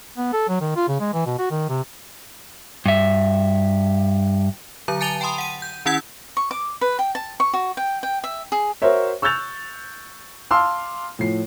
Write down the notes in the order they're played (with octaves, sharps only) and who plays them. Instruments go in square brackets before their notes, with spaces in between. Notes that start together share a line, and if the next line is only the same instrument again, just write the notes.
[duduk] B3
A4
F#3
D#3
F4
C#3
G#3
E3
B2
F#4
D#3
C3
[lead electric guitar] G2 E5
[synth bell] D3 F#3 A#5
G#5 A5 A6 D#7 F7 G7
G5 A5 B5 C6 D#6
F#5 D#7
G6
D#3 C#4 E4 F#5 E6 G#6
[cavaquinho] C#6
D6
B4
G5
A5
C#6
F#4
G5
G5
E5
G#4
[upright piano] F#4 A#4 C5 C#5 E5
C#6 E6 F#6 G6 A6 F7
F5 A5 C6 D6 E6 F6
A2 F3 C7